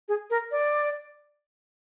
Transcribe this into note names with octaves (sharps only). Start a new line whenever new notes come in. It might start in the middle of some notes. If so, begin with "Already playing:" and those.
G#4
A#4
D5